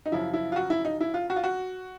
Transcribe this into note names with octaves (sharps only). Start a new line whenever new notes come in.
D#4
F#2 C#3 F3 E4
E4
F4
F#4
E4
D#4
E4
F4
F#4
F4
F#4